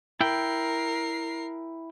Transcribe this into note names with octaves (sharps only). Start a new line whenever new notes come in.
E4 A#4 G5 C7